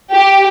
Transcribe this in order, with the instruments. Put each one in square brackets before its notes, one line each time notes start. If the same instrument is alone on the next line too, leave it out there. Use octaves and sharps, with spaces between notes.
[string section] G4